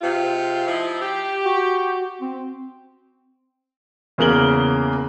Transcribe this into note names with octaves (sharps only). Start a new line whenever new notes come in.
C3 G#3 F4
F3 D#4 E4
G4
F#4
C4
E2 C#3 A#3 A#4 F#7 G7